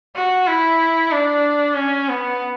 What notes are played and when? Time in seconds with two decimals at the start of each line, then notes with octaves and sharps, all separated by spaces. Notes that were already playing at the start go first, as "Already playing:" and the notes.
0.15 F#4
0.47 E4
1.12 D4
1.76 C#4
2.09 B3